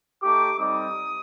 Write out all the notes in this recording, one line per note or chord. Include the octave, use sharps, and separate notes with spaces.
A3 D#4 G4 D6
G3 C4 D#4 D#6